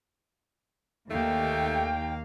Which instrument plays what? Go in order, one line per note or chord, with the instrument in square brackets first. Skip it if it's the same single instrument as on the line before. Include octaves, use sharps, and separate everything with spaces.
[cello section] D#2 [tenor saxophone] A3 [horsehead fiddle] A#3 F5 [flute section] G5